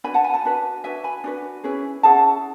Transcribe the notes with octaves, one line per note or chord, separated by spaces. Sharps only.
D4 F#4 B4 G#5 B5
F#5 A5
G#5 B5
F#5 A5
D4 F#4 B4
D4 F#4 B4 E5 G#5
G#5 B5
D4 F#4 B4
C#4 E4 G#4 B4
C#4 E4 G#4 F#5 A5